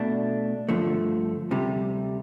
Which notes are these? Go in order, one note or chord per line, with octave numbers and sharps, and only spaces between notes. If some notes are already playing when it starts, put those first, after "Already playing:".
Already playing: B2 A3 D4
G2 D3 F3 A3
D2 C3 G3